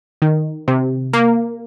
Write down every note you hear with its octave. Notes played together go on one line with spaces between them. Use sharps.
D#3
C3
A#3